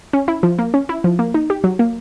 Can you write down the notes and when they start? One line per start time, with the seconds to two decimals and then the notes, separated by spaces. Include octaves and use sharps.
0.13 C#4
0.28 E4
0.43 F3
0.59 A#3
0.74 C#4
0.89 E4
1.04 F3
1.19 A#3
1.34 D#4
1.50 G4
1.64 F#3
1.79 A#3